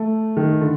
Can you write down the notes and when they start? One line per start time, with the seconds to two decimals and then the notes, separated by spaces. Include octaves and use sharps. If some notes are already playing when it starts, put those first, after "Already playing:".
Already playing: A3
0.37 D#3
0.61 D3